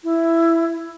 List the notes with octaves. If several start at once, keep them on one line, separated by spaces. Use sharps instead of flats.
E4